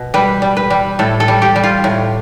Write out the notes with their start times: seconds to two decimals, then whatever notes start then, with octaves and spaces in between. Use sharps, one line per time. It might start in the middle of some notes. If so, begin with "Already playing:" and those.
Already playing: B2
0.14 G3 B4
0.42 G3
0.57 B4
0.70 G3
0.99 A2 A4
1.20 A4
1.28 G3
1.42 G4
1.56 G3
1.64 F4
1.84 A2